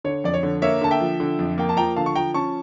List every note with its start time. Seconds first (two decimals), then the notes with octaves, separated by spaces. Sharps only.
0.04 D3 C#5
0.24 F2 D5
0.34 C#5
0.43 D3
0.62 A#3 C#5 E5
0.81 D3 A5
0.91 E5 G5
1.00 F3
1.20 D3
1.39 F2
1.58 A#3 G5
1.69 A5
1.77 F3 G5 A#5
1.96 D3 F5 A5
2.06 C#6
2.16 F3 G5 A#5
2.34 C#4 A5 C#6